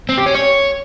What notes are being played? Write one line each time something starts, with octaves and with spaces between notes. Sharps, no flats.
C4
G4
C#4
C#5